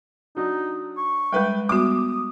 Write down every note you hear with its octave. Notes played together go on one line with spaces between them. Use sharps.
F#3 D4 D#4
C#6
G3 G#3 B4 G5
G3 B3 F#4 D6 D#6